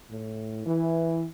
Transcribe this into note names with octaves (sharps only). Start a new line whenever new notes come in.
A2
E3